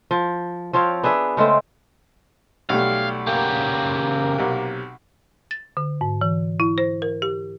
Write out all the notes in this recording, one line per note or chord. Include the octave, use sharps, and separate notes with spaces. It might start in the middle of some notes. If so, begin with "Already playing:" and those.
F3
F3 C4 C#5 F5
B3 D4 G#4 E5
C#3 G#3 A3 C4
B1 G3 A3 G4 F5
C#3 A#3 G4
B1 C3
A6
D3
G#2
E3
E4
C5
A#4
G4